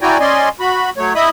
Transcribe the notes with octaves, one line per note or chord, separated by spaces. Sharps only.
E4 F#4 D5 G5 G#5 A#5
C#4 D5 D#5 G#5 C6
F#4 B5
F#3 A3 C#5
E4 D#5 E5 B5 D#6